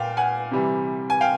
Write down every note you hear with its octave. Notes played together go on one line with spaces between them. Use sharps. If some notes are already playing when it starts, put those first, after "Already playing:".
Already playing: A#2 F5 G5
F#5 G#5
C3 E3 G3
G#5
F5 G5